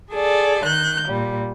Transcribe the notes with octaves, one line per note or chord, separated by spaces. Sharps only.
G#4 A4 D5
D#3 F#6 G6
A#2 G3